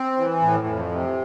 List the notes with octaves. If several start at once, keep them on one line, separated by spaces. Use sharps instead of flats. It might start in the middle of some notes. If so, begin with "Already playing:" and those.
Already playing: C4
E3
A2
F2
C3